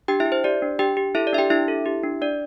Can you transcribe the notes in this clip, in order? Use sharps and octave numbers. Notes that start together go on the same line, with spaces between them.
D4 G4 G5
E4 E5
G4
C5
G4 D5
D4
D4 G4 G5
G4
E4 A4 E5
D5
D4 E5
G4 G5
D4 E4 E5
A4
G4
D4
D4 D5